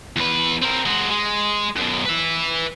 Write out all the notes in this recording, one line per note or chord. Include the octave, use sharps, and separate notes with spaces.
E2 B4
C4 A#4
G#3 F#4
G#3
F#2 B2
B4 E5